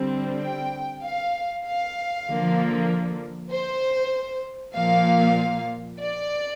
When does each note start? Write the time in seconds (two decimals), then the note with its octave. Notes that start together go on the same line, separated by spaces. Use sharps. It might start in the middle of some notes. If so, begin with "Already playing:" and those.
Already playing: D3 G3 C4
0.41 G5
1.02 F5
1.65 F5
2.27 D3 F3 A#3
3.51 C5
4.75 A#2 F3 A#3 F5
6.00 D5